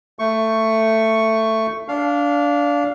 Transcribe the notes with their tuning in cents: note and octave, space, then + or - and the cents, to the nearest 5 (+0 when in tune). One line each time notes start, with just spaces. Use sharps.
A3 +15 C#6 +0
D4 -20 F5 +0